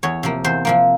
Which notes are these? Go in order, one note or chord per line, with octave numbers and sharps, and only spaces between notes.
E2 C#5
C3 F3 A#3
E2 C5
C3 F3 A#3